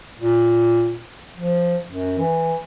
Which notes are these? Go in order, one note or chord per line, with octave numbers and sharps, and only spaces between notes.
A#2
F3
F#2
E3